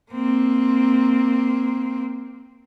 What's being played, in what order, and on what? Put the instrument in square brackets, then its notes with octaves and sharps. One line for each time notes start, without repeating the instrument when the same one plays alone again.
[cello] A#3 C4